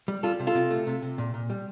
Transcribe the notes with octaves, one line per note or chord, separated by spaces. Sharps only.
G3
G3 F4 A4
C3
F4 A4
C3
A3
C3
C3
A#2
A#2
G3